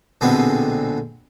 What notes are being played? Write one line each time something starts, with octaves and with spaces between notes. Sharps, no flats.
A#1 B2 D3 G#3 B3 C4